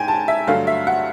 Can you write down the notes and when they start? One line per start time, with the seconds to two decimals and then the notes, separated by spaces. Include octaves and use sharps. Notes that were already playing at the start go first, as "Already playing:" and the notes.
Already playing: G#2 G5 G#5
0.08 A5
0.28 E5
0.47 G2 D3 F#3 A3 F5
0.67 E5
0.87 F#5